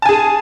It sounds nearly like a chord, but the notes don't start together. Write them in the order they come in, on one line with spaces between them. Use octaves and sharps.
A5 G#5 G#4